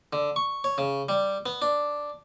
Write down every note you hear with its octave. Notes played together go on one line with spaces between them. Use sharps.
D3
C#6
C#5
C#3
G3
B3
D4